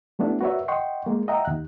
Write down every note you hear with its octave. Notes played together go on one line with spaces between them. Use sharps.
G3 A3 B3 D4 E4
F#4 A#4 B4 C#5 D5 E5
D#5 F#5 G5 C6 C#6
G#3 A#3
D#5 E5 F#5 G5 A#5
D#2 F#6